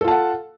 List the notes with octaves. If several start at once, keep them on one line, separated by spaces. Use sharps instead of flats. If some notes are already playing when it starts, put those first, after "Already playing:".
F4 A4 F#5 A5